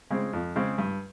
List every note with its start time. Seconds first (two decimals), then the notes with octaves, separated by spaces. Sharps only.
0.11 C#3 G#3 C4
0.33 F2
0.56 C#3 G#3 C4
0.78 G2